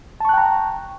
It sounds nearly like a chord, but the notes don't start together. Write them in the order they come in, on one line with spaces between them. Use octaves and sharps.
A5 C#6 F#6 G5 A#5